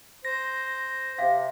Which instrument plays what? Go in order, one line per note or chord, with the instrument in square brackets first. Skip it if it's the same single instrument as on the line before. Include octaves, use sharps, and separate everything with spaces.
[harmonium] C5 [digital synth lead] A#6
[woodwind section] C3 [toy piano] F5